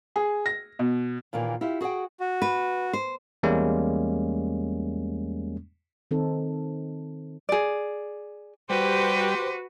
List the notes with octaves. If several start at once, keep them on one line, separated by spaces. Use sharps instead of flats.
G#4
A#6
B2
D#2 A#2 D#3 E3 A#3
E4 F4 G4
F#4 G#4 C5 F#5 G5
F#4
B4
C5
E2 G3 G#3 A#3 C#4
D#3 C4 D#4 A4
G#4 D5
G3 F#4 G4 B4 C5